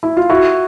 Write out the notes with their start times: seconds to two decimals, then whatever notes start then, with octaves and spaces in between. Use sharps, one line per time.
0.03 E4
0.17 F4
0.29 E4 F#4